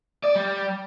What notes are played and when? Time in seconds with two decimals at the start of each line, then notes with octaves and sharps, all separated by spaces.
0.24 D5
0.36 G3